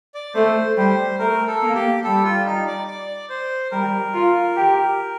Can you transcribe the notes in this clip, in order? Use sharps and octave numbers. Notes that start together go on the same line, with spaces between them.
D5
A3 C5
G3 C5
A3 A#4
A4
A#3
G4
G3 A4
F4
D#4
D5
D5
C5
G3 A#4
F4
G4